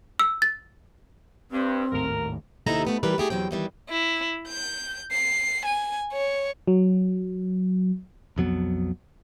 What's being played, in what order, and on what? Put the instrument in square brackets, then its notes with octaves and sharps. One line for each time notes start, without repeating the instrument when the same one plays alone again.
[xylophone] E6
A6
[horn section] G2 [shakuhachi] C4
[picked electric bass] G#1 D#2 A2 [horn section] A#4
[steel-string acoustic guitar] D#2 C3 D#4 E4 A4 A#5
A3 B3 C4
E3 G3 G4 A#4 B4
A3 G4 G#4
E2 F#3 C4 G5
D#3 E3 G3
[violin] E4
G6
C7
G#5
C#5
[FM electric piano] F#3
[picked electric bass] B1 F2 F#3 B3